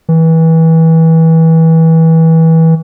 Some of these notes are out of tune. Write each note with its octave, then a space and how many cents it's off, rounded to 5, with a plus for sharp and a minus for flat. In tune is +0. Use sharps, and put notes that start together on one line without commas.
E3 -25